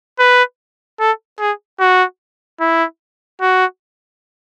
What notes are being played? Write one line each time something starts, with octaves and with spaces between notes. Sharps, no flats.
B4
A4
G#4
F#4
E4
F#4